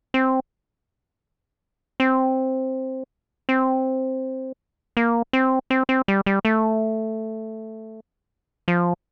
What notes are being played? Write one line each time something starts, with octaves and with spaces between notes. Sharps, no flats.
C4
C4
C4
A#3
C4
C4
C4
G3
G3
A3
F3